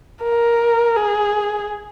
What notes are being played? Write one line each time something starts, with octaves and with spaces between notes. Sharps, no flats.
A#4
G#4